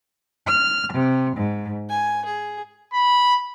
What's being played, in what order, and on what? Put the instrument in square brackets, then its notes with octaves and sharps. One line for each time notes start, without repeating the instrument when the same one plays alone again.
[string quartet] F6
C3
G#2
G#5
G#4
[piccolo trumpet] B5